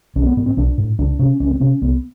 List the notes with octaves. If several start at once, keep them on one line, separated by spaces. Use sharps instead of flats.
B1 C#4
B3
A2 B3
C4
B1 D4
A2
C#2 D4
C3 C#4
C#2 C#4
C4
C3 C#4
C2 B3